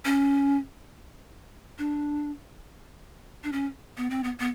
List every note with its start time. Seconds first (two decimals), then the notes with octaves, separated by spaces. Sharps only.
0.05 C#4
1.78 D4
3.44 D4
3.52 C#4
3.97 B3
4.10 C4
4.24 B3
4.40 B3